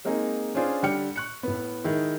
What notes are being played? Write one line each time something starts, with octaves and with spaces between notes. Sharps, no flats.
G#3 A#3 C4 D#4 G#4
C#4 D4 F4 G#4 C5 D5
D3 G3 D5 G5 F6 C#7
C#6 F#6 C#7
A2 B3
D#3 G#3 E4